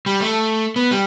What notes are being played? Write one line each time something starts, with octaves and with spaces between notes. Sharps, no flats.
G3
A3
B3
G3